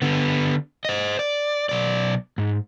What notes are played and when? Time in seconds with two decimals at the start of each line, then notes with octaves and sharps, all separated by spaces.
0.02 D3 B3
0.85 C5 D#5
1.19 D5
1.69 B1 D5
2.38 G#2